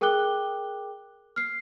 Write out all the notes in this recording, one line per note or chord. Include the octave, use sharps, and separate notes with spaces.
G#4 A#4 G5 D6 F#6 G7
F6 C7